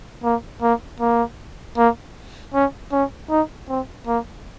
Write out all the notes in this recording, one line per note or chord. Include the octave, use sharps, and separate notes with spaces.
A#3
A#3
A#3
A#3
C#4
C#4
D#4
C4
A#3